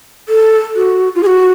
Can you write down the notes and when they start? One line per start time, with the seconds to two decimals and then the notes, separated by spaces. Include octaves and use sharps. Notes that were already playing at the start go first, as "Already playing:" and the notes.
0.29 A4
0.76 F#4
1.15 F4
1.23 G#4
1.26 F#4